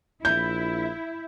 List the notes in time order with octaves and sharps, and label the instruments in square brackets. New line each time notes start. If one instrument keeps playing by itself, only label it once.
[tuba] A#1 [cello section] E4 [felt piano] G6